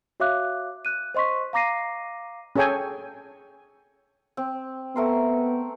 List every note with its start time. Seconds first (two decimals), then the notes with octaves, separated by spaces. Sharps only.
0.20 F#4 C#5 E5 F5 D6 F#6
0.85 F#6 D#7
1.15 C5 D#5 C6 C#6 B6
1.53 F5 A#5 D6 A#6 C7 D#7
2.56 C#4 G#4 A4 C#5 G5 G#5
4.37 C4
4.96 A3 B3 A#4 C6